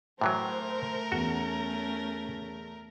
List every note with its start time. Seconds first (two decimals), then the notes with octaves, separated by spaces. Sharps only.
0.21 A2 E3 F#3 A3 A#4 C5
1.12 E2 C#4 F#4